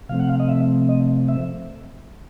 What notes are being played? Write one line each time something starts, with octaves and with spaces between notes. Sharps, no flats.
C3 F3 A3 C4 F5
F#5
F5
D#5
E5
D#5
E5